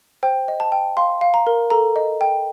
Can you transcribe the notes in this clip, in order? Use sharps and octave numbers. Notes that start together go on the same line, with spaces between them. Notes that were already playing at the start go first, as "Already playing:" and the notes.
C5 G5
D#5
A5
G5
F5 C6
F5
A#5
A#4
A4 A#5
D#5
G5